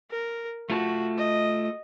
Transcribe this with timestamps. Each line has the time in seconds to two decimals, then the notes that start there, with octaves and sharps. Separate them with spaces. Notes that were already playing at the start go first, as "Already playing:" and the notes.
0.11 A#4
0.70 A3 F4 F#4 A5
1.18 D#5